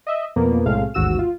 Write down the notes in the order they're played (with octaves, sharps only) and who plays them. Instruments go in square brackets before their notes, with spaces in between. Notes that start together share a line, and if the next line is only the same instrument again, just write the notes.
[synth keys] D#5 E5
F2 B2 F3 A#3 B3
B1 A2 C3 G#3 A3 F5
A1 D#2 G#2 F#4 E6 E7
F4